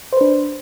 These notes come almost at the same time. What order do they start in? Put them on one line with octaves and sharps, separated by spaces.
C5 B4 D4